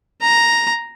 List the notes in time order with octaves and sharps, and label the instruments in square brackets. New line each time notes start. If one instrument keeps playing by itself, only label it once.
[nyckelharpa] A#5